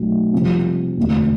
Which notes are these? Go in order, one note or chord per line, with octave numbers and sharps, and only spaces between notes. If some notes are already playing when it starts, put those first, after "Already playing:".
Already playing: B1 B2 A3
F2 C3 G3 C4 F4
E1 D2 D3